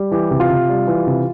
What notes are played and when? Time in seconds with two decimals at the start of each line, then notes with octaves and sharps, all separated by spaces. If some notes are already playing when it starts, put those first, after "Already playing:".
Already playing: G3
0.11 E3 G4
0.31 C3
0.40 F4
0.50 C3
0.69 G3
0.87 E3
1.07 C3